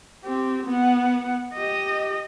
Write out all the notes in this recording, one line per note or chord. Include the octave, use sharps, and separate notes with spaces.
C4 G4
B3 F#5
G4 D#5